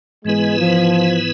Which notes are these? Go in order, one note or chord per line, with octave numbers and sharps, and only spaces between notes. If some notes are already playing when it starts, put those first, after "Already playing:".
G#2 E3 G#3 B3 E4 B4
F3